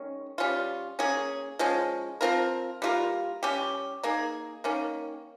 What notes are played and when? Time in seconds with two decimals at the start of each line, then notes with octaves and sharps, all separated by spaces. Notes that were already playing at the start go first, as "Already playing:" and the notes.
Already playing: D#3 G#3 C#4
0.38 G3 C#4 F4
0.99 A#3 C#4 G#4
1.59 F3 G#3 C#4
2.21 F3 C4 F4 A#4
2.82 G3 A#3 F4 A#4
3.43 G3 C#4 G4
4.03 A#3 D#4 G#4
4.64 D#3 A#3 C#4